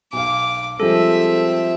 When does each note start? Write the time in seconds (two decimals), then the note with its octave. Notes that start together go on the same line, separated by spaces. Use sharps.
0.13 B1 F5 D6
0.80 F3 G3 G#3 C4 A4 E5